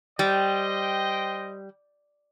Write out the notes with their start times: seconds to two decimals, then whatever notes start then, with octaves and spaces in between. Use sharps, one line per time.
0.19 G3 C5 D#5 G5